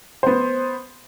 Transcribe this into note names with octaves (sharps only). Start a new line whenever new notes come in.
B3 C5